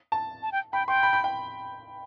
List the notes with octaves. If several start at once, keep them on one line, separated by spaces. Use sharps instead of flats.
A5
A5
G5
G5 B5
G5 C6
B5
B5
G5